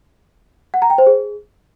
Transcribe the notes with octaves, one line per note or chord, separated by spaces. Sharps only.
F#5
A#5
G5
C5
G#4